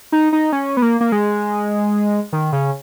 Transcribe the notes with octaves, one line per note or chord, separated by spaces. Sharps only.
D#4
D#4
C#4
B3
A#3
A#3
G#3
D#3
C#3